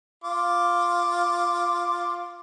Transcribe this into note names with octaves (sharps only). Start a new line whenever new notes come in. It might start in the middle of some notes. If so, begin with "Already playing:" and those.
F4 D6